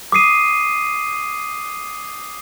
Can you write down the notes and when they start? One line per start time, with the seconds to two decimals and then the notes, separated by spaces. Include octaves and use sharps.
0.12 D6 D#6 C7 D#7